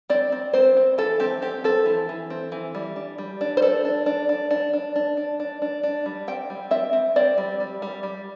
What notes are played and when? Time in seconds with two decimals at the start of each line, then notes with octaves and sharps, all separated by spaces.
0.10 C4 D5
0.32 C4
0.53 C4 C5
0.77 C4
0.98 E3 A4
1.20 C4 G4
1.42 C4 G4
1.64 C4 A4
1.86 E3
2.09 E3
2.30 C4
2.52 E3
2.75 G3
2.96 D4
3.18 G3
3.41 D4
3.57 C5
3.62 D4 A4
3.85 D4
4.06 D4
4.29 D4
4.51 D4
4.73 D4
4.96 D4
5.17 D4
5.40 D4
5.62 D4
5.83 D4
6.06 G3
6.28 C4 G5
6.50 G3
6.71 C4 E5
6.93 C4
7.16 C4 D5
7.38 G3
7.60 G3
7.82 G3
8.03 G3